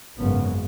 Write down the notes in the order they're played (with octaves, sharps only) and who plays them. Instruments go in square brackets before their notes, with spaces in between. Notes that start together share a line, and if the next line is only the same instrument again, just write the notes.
[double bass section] G#1 F#2 C#3 B3